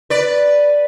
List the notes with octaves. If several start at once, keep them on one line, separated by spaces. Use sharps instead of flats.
B4 D5